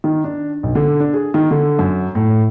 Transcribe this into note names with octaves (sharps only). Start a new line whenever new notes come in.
D#3
D4
B1
D3
D4
G#4
D#3
D3
F#2
A2